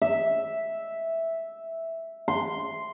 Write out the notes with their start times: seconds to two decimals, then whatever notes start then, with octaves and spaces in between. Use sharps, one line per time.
0.02 E5
2.28 C6